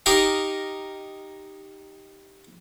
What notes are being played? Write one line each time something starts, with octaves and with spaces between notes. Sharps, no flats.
D#4 G4 A#4 D#5 F5